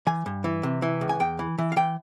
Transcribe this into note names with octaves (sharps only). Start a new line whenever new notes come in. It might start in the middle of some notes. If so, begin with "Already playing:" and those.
E3 G#5
G2
E3
C3
E3
C#2
G#5
E2 G5
E3
E3
F5
E3 G5